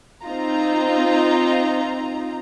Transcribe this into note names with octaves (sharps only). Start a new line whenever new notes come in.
C4 D#4 F4 A#5